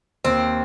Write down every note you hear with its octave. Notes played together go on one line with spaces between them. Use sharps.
D#2 C4